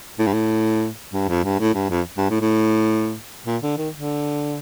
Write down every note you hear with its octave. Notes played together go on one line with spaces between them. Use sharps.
A2
G2
A2
G2
F2
G2
A2
G2
F2
G2
A2
A2
A#2
D3
D#3
D3